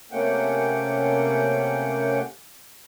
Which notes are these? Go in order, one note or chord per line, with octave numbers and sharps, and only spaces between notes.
C3 A3 A#3 C#4 F#5 G5